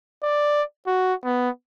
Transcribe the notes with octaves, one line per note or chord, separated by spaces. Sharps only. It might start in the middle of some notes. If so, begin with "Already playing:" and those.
D5
F#4
B3